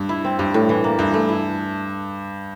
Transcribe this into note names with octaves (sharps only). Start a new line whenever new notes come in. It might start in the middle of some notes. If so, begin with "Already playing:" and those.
Already playing: G2
E4
C4
G2 G3
A2
E3
A#3
G2 E3
A3
E4